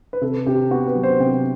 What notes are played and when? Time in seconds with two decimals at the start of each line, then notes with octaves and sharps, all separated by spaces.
0.13 B4
0.22 C3 A4
0.46 C3 G4
0.71 B3 F#4
0.88 B4
0.95 F#3
1.03 C5
1.20 C3 G5